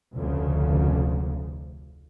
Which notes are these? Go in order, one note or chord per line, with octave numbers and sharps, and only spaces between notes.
F1 D2 C#3